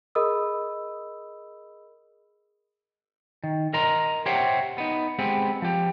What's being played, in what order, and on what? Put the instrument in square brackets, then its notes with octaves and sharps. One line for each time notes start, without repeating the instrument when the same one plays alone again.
[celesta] G#4 A#4 D#5 B5 D#6 E6
[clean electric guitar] D#3
A#4 D#5 A#5 C6
G4 C5 C#5 E5 F#5 G5
B3 D#4
G#3 B3 C4 G4
F3 G4